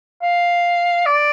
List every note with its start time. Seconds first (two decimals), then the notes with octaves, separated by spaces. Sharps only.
0.22 F5
1.06 D5